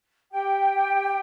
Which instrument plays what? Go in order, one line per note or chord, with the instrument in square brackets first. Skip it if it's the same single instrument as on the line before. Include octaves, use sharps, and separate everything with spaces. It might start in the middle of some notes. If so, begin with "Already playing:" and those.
[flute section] G4 G5